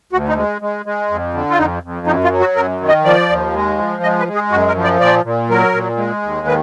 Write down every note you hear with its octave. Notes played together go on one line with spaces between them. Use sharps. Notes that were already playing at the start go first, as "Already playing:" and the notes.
D2 F#4
D#4
G#3
G#3
G#3
F2
D3
F4
F2 D#4
F2
F#2 D#4
F4
F#3
F#4
F#2 A#4
D#3
D#5
F3 D5
D#2
G#3
F3
G#3 D#5
B4
G#3
G#4
F#2 F#4
A#4
F3
D5
A#2 D5
A#2
F#3 A#4
A#2
G#3
D#2
D#3 B4